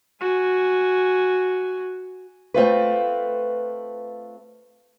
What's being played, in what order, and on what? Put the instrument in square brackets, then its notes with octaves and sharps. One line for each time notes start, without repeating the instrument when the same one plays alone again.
[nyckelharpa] F#4 G#5
[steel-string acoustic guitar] A3 C4 F4 B4